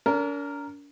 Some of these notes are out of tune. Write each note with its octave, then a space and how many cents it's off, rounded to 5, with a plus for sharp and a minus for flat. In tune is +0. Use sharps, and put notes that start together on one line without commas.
D4 -45 A#4 -5